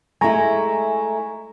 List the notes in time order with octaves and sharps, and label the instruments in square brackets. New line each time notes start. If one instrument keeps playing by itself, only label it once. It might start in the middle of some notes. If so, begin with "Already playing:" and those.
[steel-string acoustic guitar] G#3 A3 E4 [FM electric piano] G#5 A#5 C#6